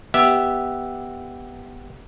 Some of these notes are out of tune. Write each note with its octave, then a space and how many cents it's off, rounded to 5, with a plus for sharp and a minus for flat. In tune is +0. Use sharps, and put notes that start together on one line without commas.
B3 -5 G4 +0 E5 +0